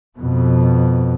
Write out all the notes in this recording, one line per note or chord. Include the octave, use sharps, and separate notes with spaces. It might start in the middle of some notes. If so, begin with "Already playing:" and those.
F2 B2